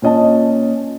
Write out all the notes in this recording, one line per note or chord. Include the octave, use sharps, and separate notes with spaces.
A#2 C#4 D#5 A5